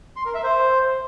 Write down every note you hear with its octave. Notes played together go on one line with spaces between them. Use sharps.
C6
A#4
E5
C5